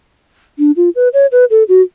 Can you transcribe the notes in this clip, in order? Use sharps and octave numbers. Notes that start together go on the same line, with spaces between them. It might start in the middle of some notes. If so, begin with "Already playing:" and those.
D4
F4
B4
C#5
B4
A4
F#4